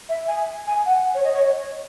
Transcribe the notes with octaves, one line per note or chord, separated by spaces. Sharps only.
E5
G#5
G#5
F#5
C#5
D#5
C#5